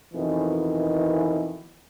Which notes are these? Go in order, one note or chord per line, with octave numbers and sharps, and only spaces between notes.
F2 B2 D#3 E3